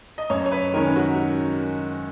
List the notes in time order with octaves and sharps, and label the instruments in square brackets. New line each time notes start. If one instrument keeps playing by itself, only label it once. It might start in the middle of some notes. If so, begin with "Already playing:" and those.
[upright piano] D#5
[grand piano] F#2 [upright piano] C#5
[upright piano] C#5
B4
[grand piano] D#3 G#3 C#4 [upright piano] A#4
[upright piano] F#4